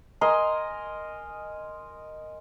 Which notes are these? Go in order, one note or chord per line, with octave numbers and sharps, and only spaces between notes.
A#4 D#5 G#5 C6